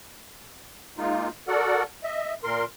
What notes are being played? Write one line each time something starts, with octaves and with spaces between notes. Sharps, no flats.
G#3 A#3 D#4 F4
F#4 A4 A#4 D5 F#5
D#5 E5
A#2 A#4 C6